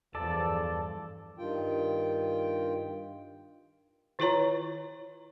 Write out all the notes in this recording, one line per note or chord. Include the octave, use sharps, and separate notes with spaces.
E2 G2 F3 A4 D5
G2 D#3 F4 G5
D#3 E4 F4 B4 C#5 A#5